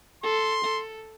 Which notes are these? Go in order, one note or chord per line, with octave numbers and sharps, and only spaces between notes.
A4 C6
A4